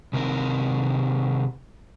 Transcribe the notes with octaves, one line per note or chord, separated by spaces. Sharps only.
C3 D#3 C4 A#4